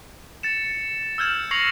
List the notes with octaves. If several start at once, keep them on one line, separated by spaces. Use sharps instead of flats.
A6 C#7 E7
E6 F6 G6 G#6 E7
C#6 A#6 C7 C#7 F7 F#7